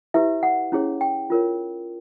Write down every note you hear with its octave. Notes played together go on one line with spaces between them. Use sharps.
E4 G4 B4 E5
F#5
C#4 E4 G#4 C#5
G5
F4 A#4 C#5